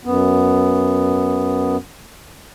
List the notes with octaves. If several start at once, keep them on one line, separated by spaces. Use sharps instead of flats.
F#2 B3